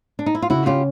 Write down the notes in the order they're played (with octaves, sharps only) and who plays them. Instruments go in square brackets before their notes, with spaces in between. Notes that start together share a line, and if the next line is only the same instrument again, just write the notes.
[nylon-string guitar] D4
D#4
E4
F4
[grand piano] C#3 [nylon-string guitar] E4 F#4
[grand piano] C#4 [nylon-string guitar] F4 G4